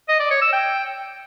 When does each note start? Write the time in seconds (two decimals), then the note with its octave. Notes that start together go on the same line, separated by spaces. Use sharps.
0.09 D#5
0.20 D5
0.31 C#5
0.42 E6
0.53 G5